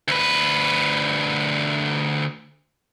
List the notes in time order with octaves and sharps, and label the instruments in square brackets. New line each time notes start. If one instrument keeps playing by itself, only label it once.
[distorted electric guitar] D2 B4